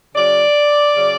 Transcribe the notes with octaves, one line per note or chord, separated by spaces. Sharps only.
C#3 F#3 C#4 D5
C#3 F#3 C#4